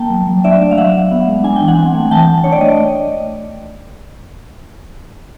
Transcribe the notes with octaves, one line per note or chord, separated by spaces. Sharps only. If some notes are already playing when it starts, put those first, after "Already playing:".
Already playing: A#3 G5 A5
F#3
F#3
D4 D5 E5
A3
F5
F#3 E5 F#5
F#3
B3
G#3
D4 G#5
G5
E3
F#5 G#5
C4
A3
E3 G5 A5
E3
D4 C#5
D5
A3 D#5